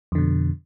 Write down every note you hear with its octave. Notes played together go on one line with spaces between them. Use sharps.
F2 B2 D3